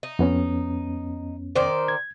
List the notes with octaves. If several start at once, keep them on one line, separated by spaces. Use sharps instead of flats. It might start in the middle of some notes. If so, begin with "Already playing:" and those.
D#4
F2 B3 C#4
D#3 C5 D5
G#6